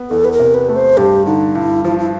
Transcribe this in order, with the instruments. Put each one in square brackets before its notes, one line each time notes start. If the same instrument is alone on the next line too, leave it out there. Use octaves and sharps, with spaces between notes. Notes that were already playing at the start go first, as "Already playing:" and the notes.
Already playing: [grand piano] B3
[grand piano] E2 [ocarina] A4
[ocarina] B4
A#4
[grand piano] C3
[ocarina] B4
[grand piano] A3
[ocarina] C5
[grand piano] G2 [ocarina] G4
[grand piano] D3 [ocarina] D#4
[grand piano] G2 [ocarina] E4
[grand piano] F3 [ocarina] E4
[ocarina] E4